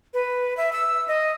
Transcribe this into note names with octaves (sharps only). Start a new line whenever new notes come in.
B4
E5
E6
D#5